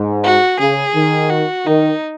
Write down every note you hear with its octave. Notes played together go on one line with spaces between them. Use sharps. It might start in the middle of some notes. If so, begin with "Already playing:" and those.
Already playing: G#2
F#4
C#3 G#4
D#3
F#4
D#3 D#4